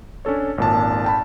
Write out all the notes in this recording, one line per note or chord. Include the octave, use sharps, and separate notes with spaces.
C#4 D4 A4 C#5
G#1 A#2 A5
G5 A5 B5